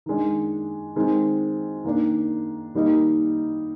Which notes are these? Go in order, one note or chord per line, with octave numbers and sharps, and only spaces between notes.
D#3 G#3 D4
D#3 G#3 C4
D#3 A#3 D4
D#3 G3 A#3 D#4